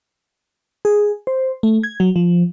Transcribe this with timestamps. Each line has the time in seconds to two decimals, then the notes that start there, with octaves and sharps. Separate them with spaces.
0.85 G#4
1.27 C5
1.63 A3
1.83 G#6
2.00 F#3
2.16 F3